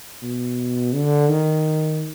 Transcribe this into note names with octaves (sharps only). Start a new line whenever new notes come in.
B2
D3
D#3